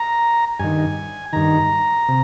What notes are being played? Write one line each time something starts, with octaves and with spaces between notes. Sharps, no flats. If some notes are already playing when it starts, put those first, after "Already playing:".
Already playing: A#5
G2 D#3 G#5
G2 D#3 A#5
C3